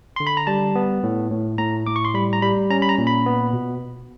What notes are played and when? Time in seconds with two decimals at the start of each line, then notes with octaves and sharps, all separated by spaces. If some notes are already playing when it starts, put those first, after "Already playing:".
0.16 D3 C6
0.27 B5
0.37 A#5
0.47 G3 A5
0.75 B3
1.03 A2
1.31 A2
1.58 A2 A#5
1.87 A2 D6
1.96 C#6
2.05 C6
2.14 G3 B5
2.33 A#5
2.42 G3 B5
2.70 C#4 A#5
2.82 B5
2.89 A#5
2.98 A#2
3.07 B5
3.26 B3
3.53 B2